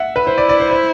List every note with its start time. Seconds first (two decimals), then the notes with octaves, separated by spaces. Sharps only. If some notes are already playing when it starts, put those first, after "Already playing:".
Already playing: E5 F#5
0.16 B4
0.27 E4 C5
0.38 D5
0.49 D5
0.60 C5
0.71 C5